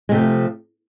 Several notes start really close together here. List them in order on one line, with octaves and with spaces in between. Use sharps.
G#3 C3 A3 F3